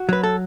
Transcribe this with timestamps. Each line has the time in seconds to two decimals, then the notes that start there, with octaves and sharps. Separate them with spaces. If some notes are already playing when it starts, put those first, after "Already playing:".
Already playing: F#4
0.09 F#3 B4
0.23 A4